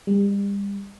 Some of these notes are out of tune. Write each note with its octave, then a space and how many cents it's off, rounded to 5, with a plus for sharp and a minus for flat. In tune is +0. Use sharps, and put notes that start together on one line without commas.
G3 +35